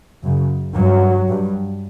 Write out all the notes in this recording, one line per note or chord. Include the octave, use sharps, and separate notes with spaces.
F#2 C#3
G2 F#3
G2